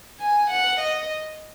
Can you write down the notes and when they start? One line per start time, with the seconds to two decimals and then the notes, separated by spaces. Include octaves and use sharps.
0.20 G#5
0.50 F#5
0.80 D#5